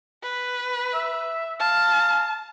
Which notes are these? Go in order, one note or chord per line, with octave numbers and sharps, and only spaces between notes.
B4
E5
F5 A5